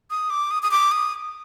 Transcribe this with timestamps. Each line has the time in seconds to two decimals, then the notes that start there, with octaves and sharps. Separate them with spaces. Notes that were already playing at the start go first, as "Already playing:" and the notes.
0.10 D#6
0.30 D6
0.51 D#6
0.63 D#6
0.71 D6
0.92 D#6